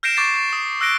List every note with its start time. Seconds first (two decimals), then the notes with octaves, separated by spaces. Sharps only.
0.03 F6 G6 A#6 C7 D7 E7
0.16 C#6 D6 G6 A6 C7 D7
0.53 D#6
0.81 E6 F#6 A#6 D7 G7